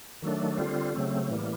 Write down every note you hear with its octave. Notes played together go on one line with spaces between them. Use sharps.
D#3 F#3 A3 D4
D3 G3 C4 F4
C#3 F#3 A3 C4
A2 E3 G3 A#3